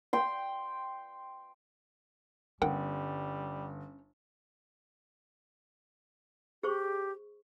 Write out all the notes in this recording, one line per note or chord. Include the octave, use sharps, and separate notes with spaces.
G5 C6
G1 G3 C#4 A#4 F#5 G5
G4 G#4 C5 C#6